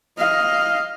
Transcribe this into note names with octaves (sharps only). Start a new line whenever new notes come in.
D#5 F5